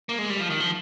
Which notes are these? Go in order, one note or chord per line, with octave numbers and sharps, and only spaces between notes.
A#3
G#3
G3
F3
D#3
F3